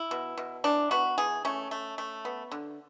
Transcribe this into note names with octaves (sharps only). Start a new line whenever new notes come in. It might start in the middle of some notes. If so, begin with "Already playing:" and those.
Already playing: E4
B2
B2
E3 D4
B3 F#4
E3 G#4
A3 C#4
A3
A3
B3
D3